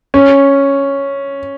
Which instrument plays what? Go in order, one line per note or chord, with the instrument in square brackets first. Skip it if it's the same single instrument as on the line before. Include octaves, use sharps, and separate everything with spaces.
[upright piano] C#4